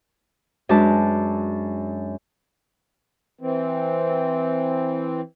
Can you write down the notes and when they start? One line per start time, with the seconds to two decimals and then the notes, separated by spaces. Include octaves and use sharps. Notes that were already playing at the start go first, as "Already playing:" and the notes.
0.69 F#2 G#3 D4 B4 A5
3.41 E3 C4